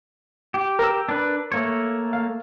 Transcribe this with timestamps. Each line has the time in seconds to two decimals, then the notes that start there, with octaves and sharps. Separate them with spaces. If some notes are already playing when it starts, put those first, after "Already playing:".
0.54 G4
0.79 A#4 E6
1.09 D4 B4
1.52 A3 A#3 C#5
2.13 F5